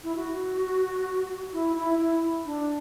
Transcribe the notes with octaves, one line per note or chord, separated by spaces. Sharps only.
E4
F#4
E4
E4
E4
D4